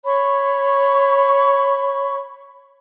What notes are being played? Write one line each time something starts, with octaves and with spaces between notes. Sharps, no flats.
C#5 B5 C#6